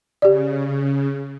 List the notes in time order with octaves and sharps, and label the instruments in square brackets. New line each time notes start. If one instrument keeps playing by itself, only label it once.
[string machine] C#3 [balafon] G4 D5